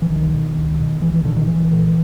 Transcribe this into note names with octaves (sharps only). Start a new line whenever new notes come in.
E3
C#2 D#3
B2
C#2
B2
C2 E3
E3
A#2 D3
D#3
C2 E3
A#2